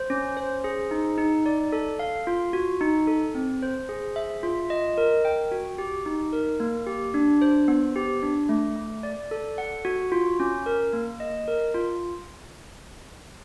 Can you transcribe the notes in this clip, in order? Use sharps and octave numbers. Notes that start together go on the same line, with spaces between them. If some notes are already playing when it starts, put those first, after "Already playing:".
Already playing: C5
C#4
C5
G#4
D#4
D#4
D5
A4
F5
F4
F#4
D#4
A4
C4
C5
G#4
E5
F4
D#5
A#4
G5
F#4
G4
D#4
A#4
A#3
G4
D4
C5
B3
G4
D4
A3
A3
D5
A4
F#5
F#4
F4
C#4
A#4
A#3
D#5
A#4
F4